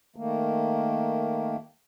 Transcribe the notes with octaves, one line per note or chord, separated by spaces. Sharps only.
D#3 A3 A#3